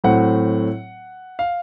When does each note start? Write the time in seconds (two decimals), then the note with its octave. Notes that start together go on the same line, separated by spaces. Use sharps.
0.04 A2 F#3 A3 C4 F#5
1.39 F5